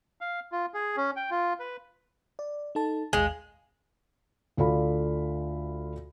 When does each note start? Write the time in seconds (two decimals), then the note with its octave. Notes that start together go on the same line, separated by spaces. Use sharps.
0.21 F5
0.52 F4
0.74 G#4
0.97 C#4
1.16 G5
1.30 F4
1.59 B4
2.39 D5
2.75 D#4 A4 A5
3.13 A1 D#2 G#3 F5
4.57 D2 F4 A4 D5 F5 B5